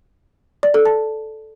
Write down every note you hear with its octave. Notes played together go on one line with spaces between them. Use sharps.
D5
A4
A5